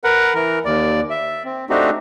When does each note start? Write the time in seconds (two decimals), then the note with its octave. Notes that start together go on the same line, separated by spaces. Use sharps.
0.04 A#4 B4 F#5
0.34 E3 A#4
0.65 D#2 D5
1.10 E5
1.45 C4
1.69 A3 C4 D4 D#4 F#4 G4